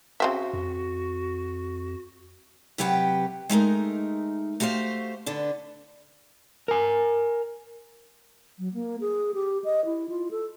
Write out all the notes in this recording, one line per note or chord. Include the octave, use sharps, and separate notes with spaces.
C#3 C4 F#4 E5
F2
C3 F#3 G4 B4 F#5 G5
G#3 A3 D#4 A#4
A3 F#4 G4 C5 F5
D3 B3 D4
A#4 G#5
F#3
A#3
G#4
G4
D#5
E4
F4
A4